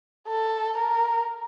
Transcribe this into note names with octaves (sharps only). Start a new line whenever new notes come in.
A4
A#4